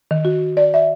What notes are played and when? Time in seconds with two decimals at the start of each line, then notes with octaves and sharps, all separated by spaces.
0.11 D#3
0.25 F#4
0.57 D5
0.74 E5